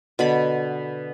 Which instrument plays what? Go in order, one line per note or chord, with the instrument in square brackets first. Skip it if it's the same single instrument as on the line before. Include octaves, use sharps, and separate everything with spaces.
[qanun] B2 D3 B5